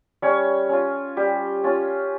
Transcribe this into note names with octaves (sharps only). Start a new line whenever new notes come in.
G3 C#4 C#5
C#4 F4
G3 G4
C#4 F4